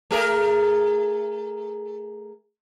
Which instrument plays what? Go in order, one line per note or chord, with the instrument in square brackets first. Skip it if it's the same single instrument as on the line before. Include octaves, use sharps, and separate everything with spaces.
[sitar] A3 G#4 A#4